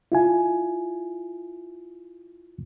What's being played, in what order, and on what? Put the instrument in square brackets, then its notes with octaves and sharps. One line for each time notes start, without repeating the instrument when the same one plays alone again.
[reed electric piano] E4 F4 G#5